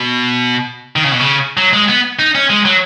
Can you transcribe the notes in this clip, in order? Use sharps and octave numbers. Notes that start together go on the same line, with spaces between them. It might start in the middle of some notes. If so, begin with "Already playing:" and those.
Already playing: B2
D#3
C#3
B2
C#3
F#3
G#3
B3
D#4
C#4
G#3
F#3